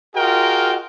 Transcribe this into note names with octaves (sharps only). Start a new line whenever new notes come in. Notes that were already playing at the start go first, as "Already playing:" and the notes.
F4 F#4 G#4 A#4 D#5 G5